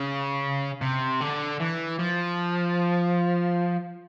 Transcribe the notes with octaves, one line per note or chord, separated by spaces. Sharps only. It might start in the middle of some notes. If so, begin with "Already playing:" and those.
Already playing: C#3
C3
D3
E3
F3